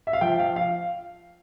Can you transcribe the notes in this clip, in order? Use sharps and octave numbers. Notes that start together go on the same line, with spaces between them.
E5
F5
F3 G5
F5
F5